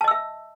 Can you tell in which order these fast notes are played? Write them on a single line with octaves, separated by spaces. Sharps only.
A5 D#5 E6 E5